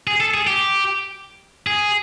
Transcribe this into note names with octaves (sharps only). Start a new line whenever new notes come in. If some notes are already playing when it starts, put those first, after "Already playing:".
G#4
A4
G#4
G4
G#4